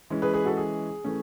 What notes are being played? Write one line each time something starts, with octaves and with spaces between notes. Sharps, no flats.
E3 G#3 C#4
G#4 B4
G#4 B4
F#4 A4
G#4
E3 A3 C#4